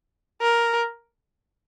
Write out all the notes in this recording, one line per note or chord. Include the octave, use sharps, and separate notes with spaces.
A#4